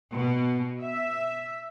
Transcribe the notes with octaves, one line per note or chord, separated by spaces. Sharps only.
B2
E5